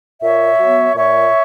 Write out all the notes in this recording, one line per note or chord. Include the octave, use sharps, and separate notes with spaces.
A#2 C#5 E5
F#3 B3
A#2 C#5 E5